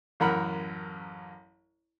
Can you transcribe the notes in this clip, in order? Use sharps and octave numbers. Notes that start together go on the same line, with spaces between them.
A1 F#2 A#4 F#5 B5